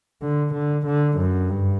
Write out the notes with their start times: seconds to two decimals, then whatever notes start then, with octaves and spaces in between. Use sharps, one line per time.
0.22 D3
0.53 D3
0.86 D3
1.18 F#2
1.49 G2